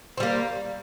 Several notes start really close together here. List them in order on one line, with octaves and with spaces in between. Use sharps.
C4 G3 A#3